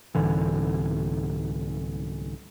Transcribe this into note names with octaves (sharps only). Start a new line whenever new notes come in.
C2 G#2 D3 E3